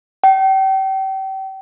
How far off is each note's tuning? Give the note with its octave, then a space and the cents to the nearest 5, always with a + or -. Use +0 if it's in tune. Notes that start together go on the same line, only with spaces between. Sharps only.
G5 -35